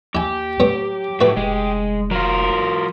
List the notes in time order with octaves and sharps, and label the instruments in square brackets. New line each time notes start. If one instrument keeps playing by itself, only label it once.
[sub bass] D#2 [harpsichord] E4 G#5 [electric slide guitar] G4
[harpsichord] A2 B3 [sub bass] F#3
[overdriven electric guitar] A2 A3 [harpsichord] F#4 B4
[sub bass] F1 [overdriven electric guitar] G#3
[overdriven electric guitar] F#3 F4 [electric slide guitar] A#4